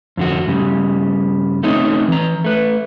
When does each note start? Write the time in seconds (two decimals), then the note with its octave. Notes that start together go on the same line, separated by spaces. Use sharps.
0.17 F2 D3 F#4
0.46 G2 C#3 G3
1.63 A3 C4 C#4 D#4
2.08 E3 A#5
2.44 A3 B4